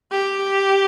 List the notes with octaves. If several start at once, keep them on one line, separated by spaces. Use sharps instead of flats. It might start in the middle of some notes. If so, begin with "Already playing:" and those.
G4